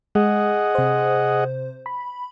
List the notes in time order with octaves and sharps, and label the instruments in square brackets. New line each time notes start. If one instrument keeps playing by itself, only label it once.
[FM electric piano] G#3 [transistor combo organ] G#4 D#5 F#5
[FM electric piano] C3 C5
B5